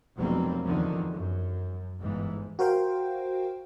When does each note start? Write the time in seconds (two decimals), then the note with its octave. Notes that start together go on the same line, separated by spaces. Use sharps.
0.15 F1 B2 F#3 G3 A#3 C4
0.64 E2 D3 D#3 F3
1.12 F#2
2.00 G1 G#2 E3
2.59 F#4 A#4 C5 F5 G5